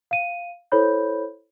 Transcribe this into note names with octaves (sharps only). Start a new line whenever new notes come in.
F5 D#7
E4 A4 C5 C#5 B5 G6